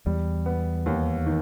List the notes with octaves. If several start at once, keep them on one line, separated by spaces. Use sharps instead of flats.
E2 G3
B3
D#2
D#3